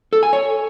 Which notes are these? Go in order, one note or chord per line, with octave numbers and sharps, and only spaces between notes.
A4
G#5
C#5